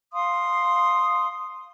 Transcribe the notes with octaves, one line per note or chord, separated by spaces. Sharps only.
F5 C6 D#6